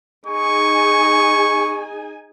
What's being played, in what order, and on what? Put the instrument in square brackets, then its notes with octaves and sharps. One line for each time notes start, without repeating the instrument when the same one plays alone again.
[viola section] D#4 G#4 G#5 [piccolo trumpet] C#6